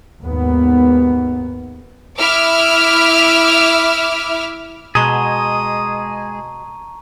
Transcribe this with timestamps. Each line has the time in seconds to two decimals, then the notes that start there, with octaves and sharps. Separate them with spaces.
0.23 D#2 G#2 B3
2.19 E4 E5 D6 E6 F6
4.95 B2 G#3 G#4 A5 A#5 C#6 D#6